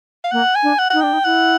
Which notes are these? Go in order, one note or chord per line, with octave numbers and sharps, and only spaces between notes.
F5
A#3 F#5
G#5
D4
F#5
D#4 F#5
D4 G5
D#4
E4 F#5